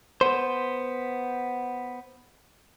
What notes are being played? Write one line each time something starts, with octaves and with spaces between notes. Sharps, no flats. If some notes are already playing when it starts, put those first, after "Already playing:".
B3 C5